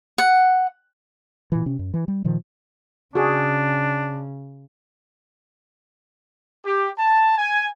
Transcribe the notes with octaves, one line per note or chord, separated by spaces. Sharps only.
F#5
A#2 E3
C3 C#4
F#2
E3
G3
A#2 D#3 F3
C#3 D4 F#4 G#4
G4
A5
G#5